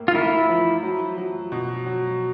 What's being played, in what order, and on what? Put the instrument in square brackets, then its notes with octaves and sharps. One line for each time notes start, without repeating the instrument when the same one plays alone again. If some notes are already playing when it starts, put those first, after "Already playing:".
Already playing: [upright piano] A2 A#3
[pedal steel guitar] F4
[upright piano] A#3 [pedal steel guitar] E4
[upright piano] F3
F#3
F#3
B2
F#3